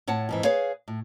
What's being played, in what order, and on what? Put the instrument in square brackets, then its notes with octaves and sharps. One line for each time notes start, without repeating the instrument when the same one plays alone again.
[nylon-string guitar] A2 C#5 F#5 A5
F2 G#2 E3
G#4 B4 C#5 F5
A2